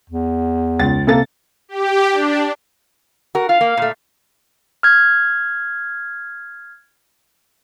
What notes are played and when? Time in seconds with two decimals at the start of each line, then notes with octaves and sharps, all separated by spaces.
0.10 E2
0.79 C#2 A6
1.07 C3 A#3 A4 A6
1.69 G4
2.12 D4
3.35 F#4 A#4
3.49 F4 F5
3.61 A#3
3.77 A#2 A3
4.83 F6 G#6